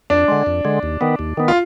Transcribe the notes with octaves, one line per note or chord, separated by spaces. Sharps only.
F2 D4
D3 G#3
F2
D3 G#3
D#2
D#3 B3
D#2
D#3 B3
F4